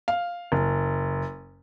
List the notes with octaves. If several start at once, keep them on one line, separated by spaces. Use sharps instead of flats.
F5
F#1